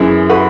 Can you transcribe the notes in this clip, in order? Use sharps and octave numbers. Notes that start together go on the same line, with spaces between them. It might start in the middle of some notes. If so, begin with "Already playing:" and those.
Already playing: F#2 E3 E4 G#4
F#4 B4